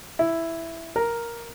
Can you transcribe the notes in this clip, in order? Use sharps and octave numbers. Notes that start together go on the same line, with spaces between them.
E4
A#4